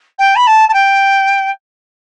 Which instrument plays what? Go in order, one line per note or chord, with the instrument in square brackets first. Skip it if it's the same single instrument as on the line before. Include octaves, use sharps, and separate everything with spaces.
[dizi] G5
B5
A5
A5
G5